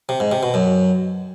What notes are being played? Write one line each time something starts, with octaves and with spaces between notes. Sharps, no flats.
C3
G#2
C3
B2
F#2